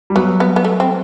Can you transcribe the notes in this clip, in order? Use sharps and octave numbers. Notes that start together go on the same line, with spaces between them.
G3
F#3 B3
B3
B3
A3
C4